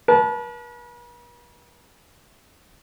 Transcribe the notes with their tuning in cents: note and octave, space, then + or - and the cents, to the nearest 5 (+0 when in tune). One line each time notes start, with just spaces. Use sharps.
B4 -45 A5 -25